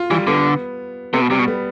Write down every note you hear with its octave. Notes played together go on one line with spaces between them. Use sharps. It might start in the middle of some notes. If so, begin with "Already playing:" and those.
Already playing: F4
E3 G3
D3 B3
C3 B3
B2
C3 G3
B2
B3